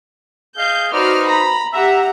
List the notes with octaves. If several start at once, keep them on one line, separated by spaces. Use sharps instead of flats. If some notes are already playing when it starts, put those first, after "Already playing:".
G#4 D#5 F5 G6
D#4 F#4 B4 C5 D5 F6
A#5 B5
G4 E5 F#5 A#5